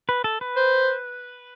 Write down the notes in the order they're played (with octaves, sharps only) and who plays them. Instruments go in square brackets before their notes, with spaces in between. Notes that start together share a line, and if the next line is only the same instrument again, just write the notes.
[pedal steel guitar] B4
A4
B4
[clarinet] C5